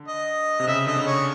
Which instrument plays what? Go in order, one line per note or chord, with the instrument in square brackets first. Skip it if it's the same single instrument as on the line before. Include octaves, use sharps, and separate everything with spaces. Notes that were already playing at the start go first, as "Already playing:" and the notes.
Already playing: [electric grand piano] D3
[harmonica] D#5
[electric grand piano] C3
[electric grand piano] C#3 [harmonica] E5
[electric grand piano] D3 [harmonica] D#5
[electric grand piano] C#3
[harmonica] C#5